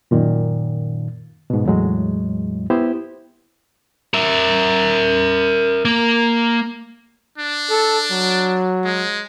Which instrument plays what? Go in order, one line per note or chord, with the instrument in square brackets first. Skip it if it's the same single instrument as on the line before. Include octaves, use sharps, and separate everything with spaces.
[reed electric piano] F#2 A#2 D#3
G#2 B2
E2 A2 F#3 G#3
B3 E4 G4 C5
[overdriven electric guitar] A#4 E5
A#3
[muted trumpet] D4
[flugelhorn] A4
F#3
[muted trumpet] G#3